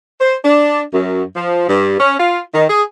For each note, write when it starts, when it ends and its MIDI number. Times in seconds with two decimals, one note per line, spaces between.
0.21 0.36 72
0.45 0.82 62
0.93 1.23 42
1.36 1.66 53
1.69 1.98 43
2.00 2.14 61
2.19 2.41 65
2.54 2.65 51
2.69 2.82 68